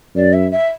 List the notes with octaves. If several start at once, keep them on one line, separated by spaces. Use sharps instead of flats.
F#2 D5
E5
E5